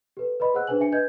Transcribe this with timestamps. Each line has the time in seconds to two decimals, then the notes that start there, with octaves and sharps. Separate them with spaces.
0.17 G4 A4 B4
0.40 B4 D5 D#5 B5 C6
0.54 G#4 C5 D#5 F#5 E6 F#6
0.67 D4 G#4 B4 C5 G#5 F#7
0.80 D4 E5 G#5 C#7
0.92 B4 D#5 G#5 G6 G#6